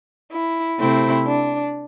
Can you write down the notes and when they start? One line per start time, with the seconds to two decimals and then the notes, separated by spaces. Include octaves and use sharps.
0.32 E4
0.79 C3 A3 C4 E4
1.26 D4